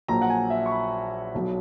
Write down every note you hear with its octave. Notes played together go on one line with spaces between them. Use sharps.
A#1 A#2 F#3 A#5
F#5
G#5
E5
C#6
B5
B1 B2 F#3